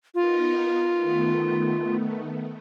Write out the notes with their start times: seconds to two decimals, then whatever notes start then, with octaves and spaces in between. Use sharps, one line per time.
0.15 B3 D#4 F4 A#4
0.96 D#3 A3 B3